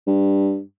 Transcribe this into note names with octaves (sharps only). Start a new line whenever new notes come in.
G2